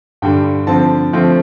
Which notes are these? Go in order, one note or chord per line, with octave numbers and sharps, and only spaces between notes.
G2 D3 G3 G5
D3 F3 C4 A5
D3 F3 A3 C4